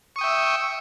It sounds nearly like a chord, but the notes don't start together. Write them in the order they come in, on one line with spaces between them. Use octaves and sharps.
C#6 D#6 G5 E5